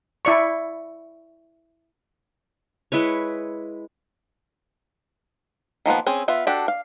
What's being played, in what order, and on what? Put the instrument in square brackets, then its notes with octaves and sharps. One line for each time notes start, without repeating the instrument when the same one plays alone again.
[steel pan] E4 D5 C#6
[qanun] G#3 E4 B4 C#5
[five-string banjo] D#3 F3 A#3 B3
C4 C#4 G#4
B3 F4 E5
D4 F#4 G4 A4
F5